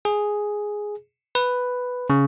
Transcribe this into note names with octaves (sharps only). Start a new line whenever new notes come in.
G#4
B4
C#3